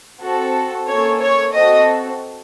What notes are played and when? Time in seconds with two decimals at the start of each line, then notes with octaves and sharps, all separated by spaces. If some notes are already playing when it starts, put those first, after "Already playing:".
0.20 C4 F#4 A4
0.86 A#3 C#4 A4 C#5
1.20 C#5
1.53 C4 F#4 A4 D#5